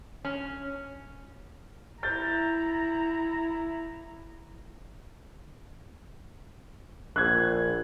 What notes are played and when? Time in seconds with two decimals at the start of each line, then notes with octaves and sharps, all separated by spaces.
0.25 C#4
2.03 E4 A#5 G6 A6
7.16 A#1 F#6 G#6